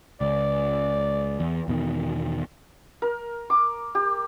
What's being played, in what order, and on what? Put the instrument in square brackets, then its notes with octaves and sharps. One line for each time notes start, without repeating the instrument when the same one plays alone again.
[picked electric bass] C#2 [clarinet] D5
[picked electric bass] E2
E2 B2 D#3
[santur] A#4
D6
G4